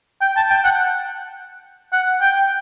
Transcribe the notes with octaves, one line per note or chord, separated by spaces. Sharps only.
G5
A5
G5
F#5
F#5
G5